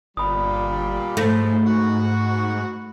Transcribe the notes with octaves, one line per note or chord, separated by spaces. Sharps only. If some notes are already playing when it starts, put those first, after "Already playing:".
G1 A#2 G3 B5 D#6
G#2 F3 A3
F#4